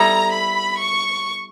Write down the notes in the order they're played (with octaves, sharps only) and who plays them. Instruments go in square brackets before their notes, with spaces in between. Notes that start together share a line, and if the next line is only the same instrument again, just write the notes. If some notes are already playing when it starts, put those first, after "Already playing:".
Already playing: [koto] G3 B3 E4 A4 [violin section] A#5
[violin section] B5
C#6